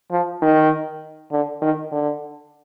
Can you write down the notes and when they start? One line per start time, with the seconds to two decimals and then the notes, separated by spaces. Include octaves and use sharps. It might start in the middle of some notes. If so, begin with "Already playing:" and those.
0.11 F3
0.42 D#3
1.32 D3
1.62 D#3
1.92 D3